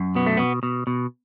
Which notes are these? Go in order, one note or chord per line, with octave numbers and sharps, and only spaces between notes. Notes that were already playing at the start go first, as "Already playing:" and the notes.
Already playing: F#2
B2 B3
A3
B2 B3
B2
B2